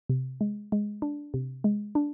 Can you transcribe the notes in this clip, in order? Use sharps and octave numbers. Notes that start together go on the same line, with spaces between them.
C3
G#3
G#3
D4
C3
G#3
D4